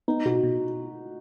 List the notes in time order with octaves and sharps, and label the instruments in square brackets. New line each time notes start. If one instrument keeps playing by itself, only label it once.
[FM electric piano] B3 [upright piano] D#4
[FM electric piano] B2 [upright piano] F#4
[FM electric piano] B2